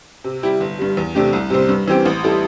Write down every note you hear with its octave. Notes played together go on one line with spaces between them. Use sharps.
C3
G3 E4 G4
G1
G2 G3
E2
C3 A3 D4 G4
C2
C3 G3 C4
G2
E3 C4 G4
A1
G3 E4 A4